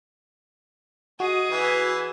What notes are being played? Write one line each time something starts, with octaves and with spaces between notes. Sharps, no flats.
F#4 G#4 D#5 D#6
E3 B4 E5 G#5